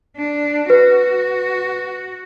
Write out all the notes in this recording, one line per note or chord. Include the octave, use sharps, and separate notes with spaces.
D4
F#4 B4